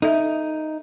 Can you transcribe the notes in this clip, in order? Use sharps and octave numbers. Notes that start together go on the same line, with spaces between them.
D#4 A4 E5